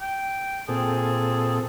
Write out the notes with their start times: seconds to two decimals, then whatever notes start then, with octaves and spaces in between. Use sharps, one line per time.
0.01 G5
0.68 A#2 C4 G#4 A4